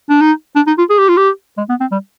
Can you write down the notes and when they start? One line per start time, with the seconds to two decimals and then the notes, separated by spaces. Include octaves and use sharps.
0.09 D4
0.21 D#4
0.56 D4
0.67 D#4
0.78 F4
0.90 G#4
0.98 G4
1.08 F4
1.17 G4
1.57 G#3
1.69 B3
1.80 C4
1.91 G3